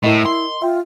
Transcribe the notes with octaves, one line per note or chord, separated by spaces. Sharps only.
A2 E4 A#4 D#5
C6
F4 E5 G5